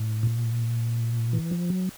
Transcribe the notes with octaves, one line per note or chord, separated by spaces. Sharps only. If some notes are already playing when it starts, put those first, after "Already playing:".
Already playing: A2
A#2
E3
F3
F#3